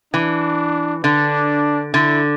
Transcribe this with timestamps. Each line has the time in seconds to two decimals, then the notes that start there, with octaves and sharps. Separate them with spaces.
0.14 E3 D4
1.04 D3 D4
1.94 D3 E4